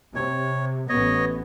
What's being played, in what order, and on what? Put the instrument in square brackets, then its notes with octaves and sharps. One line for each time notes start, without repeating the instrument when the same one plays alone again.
[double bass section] C3 [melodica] C#5
[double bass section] A1 B3 [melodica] C#5 D#5